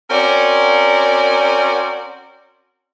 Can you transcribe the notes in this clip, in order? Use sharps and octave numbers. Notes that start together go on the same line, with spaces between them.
C4 C#4 F#4 A#4 C#5 D5